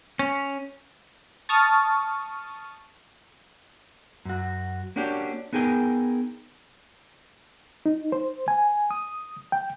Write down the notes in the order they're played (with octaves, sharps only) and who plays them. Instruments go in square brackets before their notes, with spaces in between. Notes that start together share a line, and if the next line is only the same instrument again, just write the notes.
[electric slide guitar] C#4
[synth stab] A5 C#6 D#6 F6 A6
[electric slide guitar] F#2 F#4
A#3 C#4 D4 F#4 G4
B3 D#4 G#4 A#4 G5
[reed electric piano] D#4
C5
G#5
D#6
G5